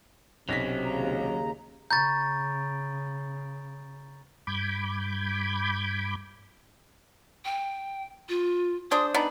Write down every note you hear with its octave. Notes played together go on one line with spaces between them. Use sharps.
B1 C3 F#3 C#4 A#6 B6
D#2 C#3 A#5
C#3 A#5 B5 C#6 G6 A6
G2 B5 D6 G6 G#6
G5
F4
G#3 D4 C5 D#6
B3 D4 D#4 B5